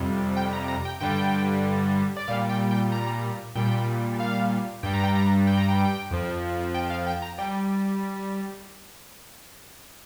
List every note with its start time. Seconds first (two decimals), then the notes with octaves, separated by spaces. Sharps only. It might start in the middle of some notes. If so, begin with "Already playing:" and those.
Already playing: F2 C3 G3
0.37 G5
0.53 A#5
0.68 A#5
0.85 G5
1.00 G2 D3 G3 G5
2.17 D5
2.28 A#2 G3 F5
2.49 G5
2.71 G5
2.92 A#5
3.55 A#2 G3 G5
4.20 F5
4.83 G2 G3 G5
4.93 A#5
5.04 G5
5.15 A#5
5.47 G5
5.58 A#5
5.69 G5
6.11 F2 F3
6.74 G5
6.90 F5
7.07 G5
7.22 A#5
7.38 G3 G5